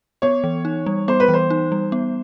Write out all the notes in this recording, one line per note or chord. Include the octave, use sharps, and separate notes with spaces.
B3 C#5
E3
D#4
G3
B3 C5
B4
E3
C5
D#4
G3
B3